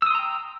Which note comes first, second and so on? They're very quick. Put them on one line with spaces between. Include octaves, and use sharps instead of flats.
E6 D#6 C6 A#5 G5